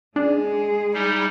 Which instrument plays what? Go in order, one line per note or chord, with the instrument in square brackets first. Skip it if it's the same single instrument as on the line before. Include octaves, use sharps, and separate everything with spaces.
[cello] G#3 G#4 [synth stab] D4
[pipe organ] G3 D#4 E4